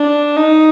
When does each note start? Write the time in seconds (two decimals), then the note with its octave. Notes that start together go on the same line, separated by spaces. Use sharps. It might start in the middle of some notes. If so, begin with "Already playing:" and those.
Already playing: D4
0.36 D#4